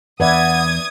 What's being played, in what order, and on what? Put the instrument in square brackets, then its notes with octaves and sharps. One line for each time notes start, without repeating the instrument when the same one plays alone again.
[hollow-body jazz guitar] E2 [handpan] B4 D5 E5 [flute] F#5 [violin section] D#6 G#6